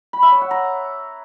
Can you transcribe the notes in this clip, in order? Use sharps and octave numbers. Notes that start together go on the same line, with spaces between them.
B5
E5
C#5
F#5
A#5